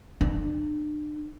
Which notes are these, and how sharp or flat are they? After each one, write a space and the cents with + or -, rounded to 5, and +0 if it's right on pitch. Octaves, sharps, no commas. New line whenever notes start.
D4 +40